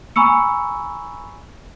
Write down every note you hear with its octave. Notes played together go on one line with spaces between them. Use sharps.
G#5 A#5 B5 C#6 E6 C#7